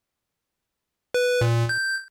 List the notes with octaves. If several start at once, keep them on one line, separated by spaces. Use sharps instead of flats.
B4
A#2
G6